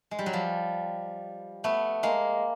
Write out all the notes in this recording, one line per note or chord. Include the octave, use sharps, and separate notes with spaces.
G#3
G3
F#3
F3 G3
A3 B3
G#3 A#3